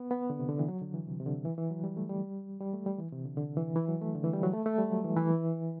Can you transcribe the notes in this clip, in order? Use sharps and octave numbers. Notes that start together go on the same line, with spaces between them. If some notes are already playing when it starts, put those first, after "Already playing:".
Already playing: B3
B3
D3
C3
D3
E3
F#3
D3
E3
C3
C3
D3
E3
E3
F#3
G3
A3
G3
G3
A3
G3
E3
C3
D3
D3
E3
E3
F#3
A3
D3
E3
G3
F#3
A3
A3
G3
F#3
E3
E3